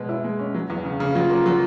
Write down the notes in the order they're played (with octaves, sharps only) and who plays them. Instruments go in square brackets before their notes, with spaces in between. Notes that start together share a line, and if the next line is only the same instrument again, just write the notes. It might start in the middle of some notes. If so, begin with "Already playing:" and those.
Already playing: [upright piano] B2 G#3
E4
G#3
C#4
F#3
E2
C#3
C#3
[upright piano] F#3 [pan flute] F4
[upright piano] A#3
F#3